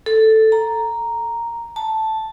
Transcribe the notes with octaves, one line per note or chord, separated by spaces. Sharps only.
A4
A#5
A5